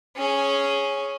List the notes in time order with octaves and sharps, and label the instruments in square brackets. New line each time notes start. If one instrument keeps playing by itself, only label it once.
[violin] C#4 G#4